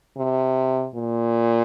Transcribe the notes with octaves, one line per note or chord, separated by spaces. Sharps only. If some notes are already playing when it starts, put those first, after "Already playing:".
C3
A#2